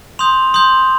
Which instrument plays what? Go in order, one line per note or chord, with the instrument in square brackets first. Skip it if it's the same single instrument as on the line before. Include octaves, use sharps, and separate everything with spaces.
[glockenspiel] C6 D#6 G6 F7
C6 D#6 G6